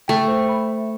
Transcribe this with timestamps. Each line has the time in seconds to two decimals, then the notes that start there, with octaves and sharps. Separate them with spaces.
0.08 A3 G5
0.28 C5
0.49 B5
0.69 E5